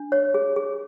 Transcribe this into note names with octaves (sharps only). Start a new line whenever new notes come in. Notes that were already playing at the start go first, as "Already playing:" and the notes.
Already playing: D4
C#5
G#4
G#4